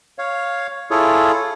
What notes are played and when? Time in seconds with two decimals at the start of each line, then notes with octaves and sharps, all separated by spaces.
0.19 C#5 F5
0.91 E4 F4 G#4 A4 C#5